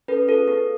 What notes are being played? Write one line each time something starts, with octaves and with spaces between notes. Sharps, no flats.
C#4 A4 B4
F4 G#4 A4 B4
B3 A4